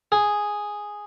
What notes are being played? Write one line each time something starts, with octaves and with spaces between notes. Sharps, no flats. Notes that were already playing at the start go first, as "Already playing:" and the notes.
G#4